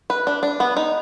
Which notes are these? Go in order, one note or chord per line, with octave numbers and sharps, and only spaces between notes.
B4
D4
D4
B3
D#4